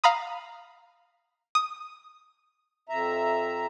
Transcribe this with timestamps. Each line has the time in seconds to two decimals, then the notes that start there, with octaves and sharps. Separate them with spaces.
0.04 F5 A#5 B5 D#6
1.55 D#6
2.89 F2 E5 A#5